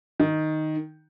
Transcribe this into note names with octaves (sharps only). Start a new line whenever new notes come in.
D#3